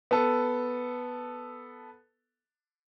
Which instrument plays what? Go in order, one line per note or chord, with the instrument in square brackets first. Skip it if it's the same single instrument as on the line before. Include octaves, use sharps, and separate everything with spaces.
[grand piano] B3 A4